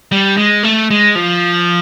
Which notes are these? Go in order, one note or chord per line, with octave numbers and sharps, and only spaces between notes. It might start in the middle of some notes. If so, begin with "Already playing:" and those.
G3
G#3
A3
G#3
F3